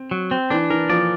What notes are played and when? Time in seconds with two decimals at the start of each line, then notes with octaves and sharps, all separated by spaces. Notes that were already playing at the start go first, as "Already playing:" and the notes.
Already playing: C4
0.11 F#3
0.31 C4
0.50 E3 D4
0.70 E3 A#4
0.90 F3 D5